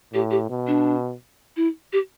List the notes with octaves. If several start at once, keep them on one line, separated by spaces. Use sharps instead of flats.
A2 G4
G4
B2
D4
E4
G4